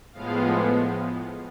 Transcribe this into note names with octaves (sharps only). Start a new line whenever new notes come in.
A2 F3 G#3 B3 F5